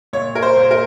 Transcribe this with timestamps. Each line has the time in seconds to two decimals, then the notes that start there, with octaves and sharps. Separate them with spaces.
0.13 A#2 C#5
0.35 A#4
0.42 C5
0.57 A#2
0.71 A#4